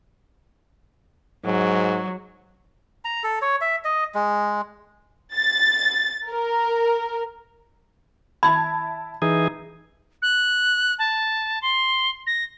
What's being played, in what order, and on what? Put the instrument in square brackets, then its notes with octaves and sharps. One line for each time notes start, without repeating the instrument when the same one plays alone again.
[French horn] G#2 [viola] F#3
[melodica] A#5
A4
C#5
E5
D#5
G#3
[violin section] A6
A#4
[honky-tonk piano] E4 A5 G#6 [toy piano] B5
[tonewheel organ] E3 D#4 G#4
[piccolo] F#6
A5
C6
A#6